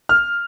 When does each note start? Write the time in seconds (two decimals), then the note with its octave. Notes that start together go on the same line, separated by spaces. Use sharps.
0.09 F6